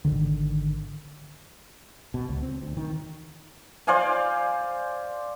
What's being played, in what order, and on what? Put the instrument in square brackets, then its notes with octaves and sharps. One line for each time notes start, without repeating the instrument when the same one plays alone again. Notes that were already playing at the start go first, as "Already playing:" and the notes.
[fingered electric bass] G#1 B2 D3 D#3
[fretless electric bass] B2
C#2
C4
D2
D#3
[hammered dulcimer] C5 D5 F5 G#5